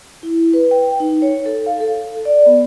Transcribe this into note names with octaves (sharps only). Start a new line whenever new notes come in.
E4
B4
G5
D#4
C#5
A4
F5
A4
D5
B3